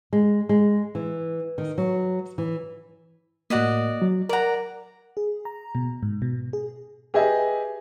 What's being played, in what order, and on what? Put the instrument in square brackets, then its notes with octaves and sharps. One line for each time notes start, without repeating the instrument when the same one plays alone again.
[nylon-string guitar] G#3
G#3
E3
D#3
F#3
E3
[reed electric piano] A2 A#3 [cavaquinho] F#4 D5 D#5
[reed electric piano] F#3
[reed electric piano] A#4 F#5 [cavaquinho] D5 A#5
[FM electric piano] G#4
A#5
B2
G#2
B2
G#4
[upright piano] G4 G#4 B4 D#5 E5 G#5